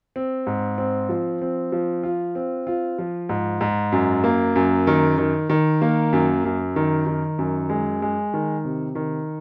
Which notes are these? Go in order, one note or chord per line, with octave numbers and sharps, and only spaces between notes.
C4
G#2
C4
F3
C4
F3
F4
C4
F4
F3
G#2
G#2
F#2
A#3
F#2
D#3
D#3
D#3
A#3
F#2
F#2
D#3
D#3
F#2
G#3
G#3
D#3
C3
D#3